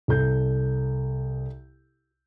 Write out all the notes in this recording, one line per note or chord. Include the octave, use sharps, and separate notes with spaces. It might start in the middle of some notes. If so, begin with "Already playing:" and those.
C2 A4 G6